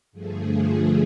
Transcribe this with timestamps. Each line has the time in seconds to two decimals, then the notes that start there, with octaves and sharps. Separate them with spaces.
0.12 G2 D3 F3 A3 G#4